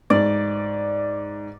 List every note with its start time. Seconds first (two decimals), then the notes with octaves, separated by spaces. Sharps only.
0.10 G#2 D5